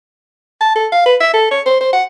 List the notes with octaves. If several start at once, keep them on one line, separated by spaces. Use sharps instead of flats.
A5
A4
F5
B4
E5
A4
C#5
C5
C5
F#5